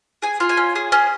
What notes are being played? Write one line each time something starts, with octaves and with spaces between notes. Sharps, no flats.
G#4 G#5
F4
G#5
C#4
G#4
C#4